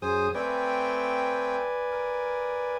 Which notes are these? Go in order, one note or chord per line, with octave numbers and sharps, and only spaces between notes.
F#2 G#4 C5 G#5 D#6
A3 C4 B4 D5 G5 G#5
A#4